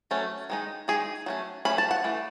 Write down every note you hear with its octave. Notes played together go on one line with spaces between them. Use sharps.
F#3 A3 C#4
D#3 G#3 D#4
D#3 G#3 D#4 G#4
F#3 A3 C#4
F#3 A3 C#4 B5
A5
F#5
E3 A3